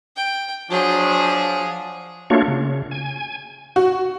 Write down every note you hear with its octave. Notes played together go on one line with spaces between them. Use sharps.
G5
F3 F#3 D4 G#4
A3 A#3 D4 F4 F#4 C#5
C#3
G#5
F#4